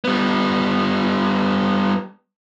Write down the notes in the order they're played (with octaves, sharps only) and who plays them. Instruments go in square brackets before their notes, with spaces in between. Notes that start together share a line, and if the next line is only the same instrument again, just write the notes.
[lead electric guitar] G3 B3